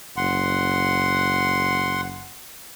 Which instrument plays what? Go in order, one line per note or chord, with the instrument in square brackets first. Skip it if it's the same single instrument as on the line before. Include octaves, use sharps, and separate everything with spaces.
[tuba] F#1 [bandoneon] F#5 C6